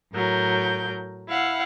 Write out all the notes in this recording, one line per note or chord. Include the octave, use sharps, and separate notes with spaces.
A2 F#3 A#4 G6
E4 F5 F#5